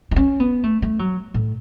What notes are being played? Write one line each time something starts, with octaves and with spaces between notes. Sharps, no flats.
E4
C#4
B3
A3
A3
F#3
A2